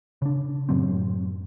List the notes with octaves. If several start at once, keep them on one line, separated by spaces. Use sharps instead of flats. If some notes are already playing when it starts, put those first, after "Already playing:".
C#3 D4
F#2 A2 F#3 C4